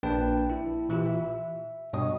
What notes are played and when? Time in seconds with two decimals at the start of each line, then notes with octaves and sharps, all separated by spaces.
0.03 A#1 A#3 D4 B4 G5 A5
0.50 E4
0.89 A#2 E3 E4 F4 G4
1.06 E5
1.93 G2 B2 C#5 D#5 D#6